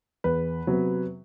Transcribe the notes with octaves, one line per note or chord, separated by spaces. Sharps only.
E2 B4
C3 F#3 B3